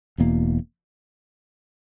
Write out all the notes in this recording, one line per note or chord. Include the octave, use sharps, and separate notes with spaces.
E1 E2 B2 A#3